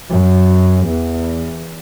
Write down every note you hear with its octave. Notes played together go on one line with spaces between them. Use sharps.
F#2
E2